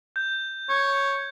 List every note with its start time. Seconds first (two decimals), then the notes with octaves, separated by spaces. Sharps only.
0.16 G6
0.69 C#5